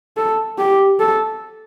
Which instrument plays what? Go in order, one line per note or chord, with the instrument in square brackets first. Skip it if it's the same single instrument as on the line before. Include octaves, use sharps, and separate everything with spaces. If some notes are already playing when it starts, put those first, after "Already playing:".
[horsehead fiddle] A4
G4
A4